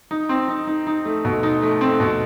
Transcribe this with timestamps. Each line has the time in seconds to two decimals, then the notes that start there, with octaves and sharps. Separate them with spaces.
0.11 D#4
0.29 C4
0.48 D#4
0.67 D#4
0.87 D#4
1.05 A3
1.25 B2
1.43 D#4
1.62 A3
1.81 C4
2.00 B2